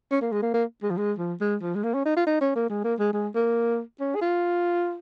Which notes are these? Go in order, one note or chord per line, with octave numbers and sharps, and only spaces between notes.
C#4
A#3
G#3
A#3
A#3
G#3
F3
G#3
F3
G#3
F3
G#3
A#3
C#4
D#4
F4
D#4
C#4
A#3
G#3
A#3
G#3
G#3
A#3
C#4
G#4
F4